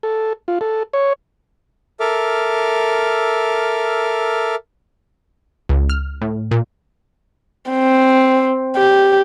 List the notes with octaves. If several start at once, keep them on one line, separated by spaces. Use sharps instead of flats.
A4
F4
A4
C#5
A4 A#4 E5 D6 F6
C#2
F6
A2
A#2
C4
G4